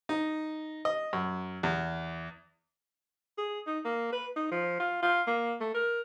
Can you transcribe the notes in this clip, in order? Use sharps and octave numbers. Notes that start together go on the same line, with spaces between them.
D#4
D#5
F#2
E2
G#4
D#4
A#3
B4
D#4
F3
F4
F4
A#3
A3
A#4